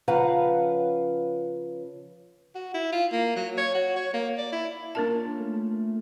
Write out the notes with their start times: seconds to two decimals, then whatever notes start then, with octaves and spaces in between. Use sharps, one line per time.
0.08 C#3 F3 B4 F5 F#5 A#5
2.55 F#4
2.74 E4
2.92 F4
3.12 A#3
3.36 F#3
3.58 C#5
3.75 F#4
3.96 C#5
4.14 A#3
4.38 D5
4.52 E4
4.95 A#3 C#4 D4 F4 A#4 A5
5.40 A3